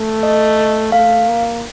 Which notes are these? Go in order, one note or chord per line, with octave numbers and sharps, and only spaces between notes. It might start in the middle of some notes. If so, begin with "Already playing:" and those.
Already playing: A3
D#5
A3 F5
A#3